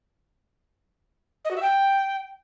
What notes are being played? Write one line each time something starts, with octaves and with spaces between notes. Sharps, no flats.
D#5
F#4
E5
G5